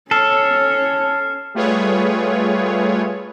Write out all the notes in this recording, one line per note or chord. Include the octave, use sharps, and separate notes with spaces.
C#4 A4 C#5 F6 C7 E7
G3 A3 F4 G#4 B4 C#5